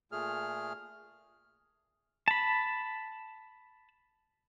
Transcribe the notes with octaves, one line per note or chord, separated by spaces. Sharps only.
A#2 A3 G#4 F6
A5 B5